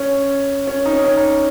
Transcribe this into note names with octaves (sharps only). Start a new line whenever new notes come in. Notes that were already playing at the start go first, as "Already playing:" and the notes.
Already playing: C#4
C#4
D#4
C#4
C#4
D#4